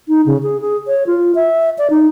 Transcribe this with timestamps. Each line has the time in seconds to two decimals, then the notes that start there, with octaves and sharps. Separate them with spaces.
0.08 D#4
0.26 C#3
0.43 G#4
0.61 G#4
0.87 C#5
1.07 F4
1.35 E5
1.78 D5
1.90 D#4